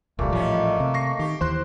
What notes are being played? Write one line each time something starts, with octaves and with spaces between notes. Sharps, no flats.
D#1 C2 A#2 G3 A3 A#3
A1 A2 D#3 F3 C#4
C3
C#6 A#6 C7
D#3 G4
D#2 E3 C5 C6 F#6